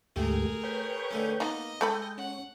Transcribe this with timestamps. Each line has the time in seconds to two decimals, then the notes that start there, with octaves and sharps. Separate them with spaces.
0.16 D2 G#2 A3 G4 G#4 A#4
0.63 B4 C#5 G5
1.11 D3 A3 C#4
1.40 A#3 B3 D#4 D#5
1.81 G#3 A3 A4 G5 B5
2.18 C#4 F#5